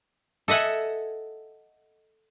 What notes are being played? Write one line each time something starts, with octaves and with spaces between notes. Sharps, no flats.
A4 D#5 E5 F#5 G#5